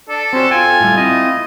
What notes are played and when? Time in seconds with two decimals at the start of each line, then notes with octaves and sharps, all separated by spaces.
0.09 D4 A4
0.33 C4 C#4 F#4 C5
0.51 F4 A4 G5 G#5
0.80 A2 G3
0.97 A3 C4 E4 D#5